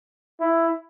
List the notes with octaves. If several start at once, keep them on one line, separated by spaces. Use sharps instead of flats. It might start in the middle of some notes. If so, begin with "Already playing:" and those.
E4